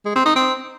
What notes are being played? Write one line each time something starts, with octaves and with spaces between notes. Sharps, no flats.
G#3
C4
D#4
C4